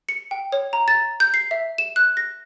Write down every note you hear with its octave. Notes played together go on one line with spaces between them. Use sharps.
C#7
G5
C#5
A#5
A6
G6
C7
E5
E7
F#6
A#6